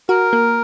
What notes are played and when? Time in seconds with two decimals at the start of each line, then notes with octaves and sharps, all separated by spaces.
0.09 F#4 A#4
0.33 A#3